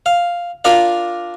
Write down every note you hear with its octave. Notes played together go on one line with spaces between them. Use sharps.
F5
D4 F4 A#4 D5 F5